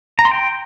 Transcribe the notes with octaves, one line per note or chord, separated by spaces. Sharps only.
A#5
C6
G5